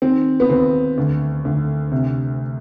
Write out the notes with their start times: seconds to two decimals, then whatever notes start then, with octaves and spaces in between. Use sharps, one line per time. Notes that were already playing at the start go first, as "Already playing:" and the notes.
0.02 D#3 C4
0.40 B3
0.50 D#2 C4
0.98 D2
1.45 D2
1.92 C3